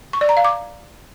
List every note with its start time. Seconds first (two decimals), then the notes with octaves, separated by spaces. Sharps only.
0.13 C#6
0.21 D5
0.29 A#5
0.37 F5
0.45 D6